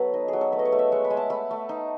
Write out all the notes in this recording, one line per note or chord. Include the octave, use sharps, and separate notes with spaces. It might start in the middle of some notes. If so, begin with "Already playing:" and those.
Already playing: F#3 B3 A4 B4
D#4
F#3 G#4
A4
A3 B4
D#5
C#5
A3
E5
G#3 F#5
B5
G#3
A5
A3 B5
A3
D#4